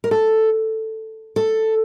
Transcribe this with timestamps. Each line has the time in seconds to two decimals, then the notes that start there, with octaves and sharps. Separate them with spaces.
0.04 A#4
0.11 A4
1.36 A4